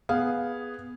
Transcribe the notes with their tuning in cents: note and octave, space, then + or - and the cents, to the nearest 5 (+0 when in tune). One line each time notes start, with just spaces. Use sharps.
B3 +0 G#4 +0 F5 +0